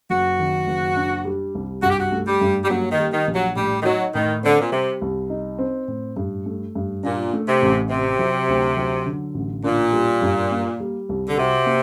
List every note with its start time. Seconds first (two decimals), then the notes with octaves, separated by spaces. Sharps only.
0.10 F#1 F#4
0.39 D#3
0.67 F#1
0.96 D4
1.25 G3
1.55 C2
1.83 G2 F#4
1.90 G4
1.99 F#4
2.12 A3
2.27 G3
2.41 G2
2.64 G3
2.70 F#3 A#3
2.92 D#3
2.99 G3
3.13 D#3
3.27 A#1
3.35 F#3
3.56 A2 G3
3.81 D#3
3.85 F#3 D#4
4.14 A2 D#3
4.43 D3 C4
4.61 A#2
4.72 C3 G3
5.02 C2
5.30 D#4
5.59 C4
5.88 A2
6.17 G2
6.46 A3
6.75 G2
7.03 A#2 D4
7.33 A3
7.48 C3
7.62 A1
7.90 C3 C4
8.19 F#3
8.49 D2
8.77 F#3
9.06 D3
9.35 A1
9.64 A#2 D4
9.93 G3
10.22 G2
10.51 A#3
10.80 G3
11.09 C2
11.29 D3
11.38 C3 F#4
11.66 A#3